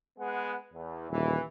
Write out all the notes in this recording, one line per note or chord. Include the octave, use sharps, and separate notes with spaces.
G#3 B3 F#5
E2
D#1 E3